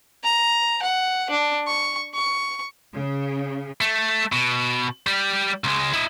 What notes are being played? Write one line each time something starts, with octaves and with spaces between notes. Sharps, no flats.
A#5
F#5
D4
C#6
C#6
C#3
A3
B2
G3 G4
C#2 G#3
E4 D#5